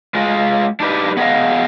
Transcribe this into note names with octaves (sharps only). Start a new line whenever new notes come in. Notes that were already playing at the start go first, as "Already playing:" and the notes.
G#3 F4
D4 D#4 G4 B4
B3 G#4 B4 D#5 F5